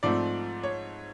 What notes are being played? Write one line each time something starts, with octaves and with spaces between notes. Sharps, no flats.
G#2 F3 A3 C4 D5
C#5